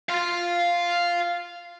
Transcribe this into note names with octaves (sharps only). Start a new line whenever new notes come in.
F5 C6